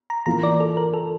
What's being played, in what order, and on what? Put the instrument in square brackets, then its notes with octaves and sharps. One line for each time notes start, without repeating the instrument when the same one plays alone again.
[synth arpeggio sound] A#5
[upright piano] E3 A#3 F4 [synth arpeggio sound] A#5
[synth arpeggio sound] D5
A4
A#4
A4